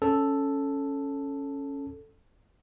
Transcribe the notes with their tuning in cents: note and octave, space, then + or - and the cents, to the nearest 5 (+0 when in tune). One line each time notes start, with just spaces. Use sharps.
C#4 +0 A4 +0